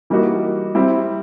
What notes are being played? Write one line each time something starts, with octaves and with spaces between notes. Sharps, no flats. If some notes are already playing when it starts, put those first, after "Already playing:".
E3 G3 A#3 D#4 F#4
G3 C4 E4